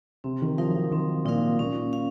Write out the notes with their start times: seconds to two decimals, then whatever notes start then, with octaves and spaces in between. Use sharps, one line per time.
0.24 C3 C4
0.42 D#3
0.58 F3 D#4 A#4 F5
0.68 F#3
0.75 F3
0.91 D#3 C4
1.25 A#2 D#4 A#4 F5
1.59 A#2 C#4
1.93 F5